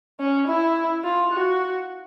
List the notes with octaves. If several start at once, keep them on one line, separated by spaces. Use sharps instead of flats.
C#4
E4
F4
F#4